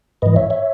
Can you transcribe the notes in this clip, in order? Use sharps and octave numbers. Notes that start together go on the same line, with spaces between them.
G#2 E3 B4 D#5
C#5 E5
C#5 E5